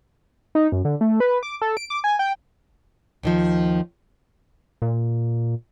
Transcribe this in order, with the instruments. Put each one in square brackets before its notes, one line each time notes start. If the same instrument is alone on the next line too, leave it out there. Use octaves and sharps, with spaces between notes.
[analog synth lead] D#4
F#2
D3
A3
B4
D6
A4
D7
D6
G#5
G5
[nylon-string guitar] D#2 D#3 F3
[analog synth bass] A#2